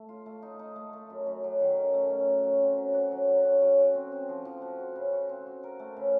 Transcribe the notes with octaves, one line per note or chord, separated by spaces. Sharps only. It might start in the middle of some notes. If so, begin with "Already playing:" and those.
Already playing: A3
F4
A3
D#4
D#4
A3
A3
F#2
F#2
F#3
D#3
C#4
A3
C#4
F#4
F#3
C4
F#3
F#4
F#3
F#3
C#4
F#3
F#4
C4
C4
F3
F3
F#4
F#4
C#3
F#4
C4
F#4
A#4
A3
C#3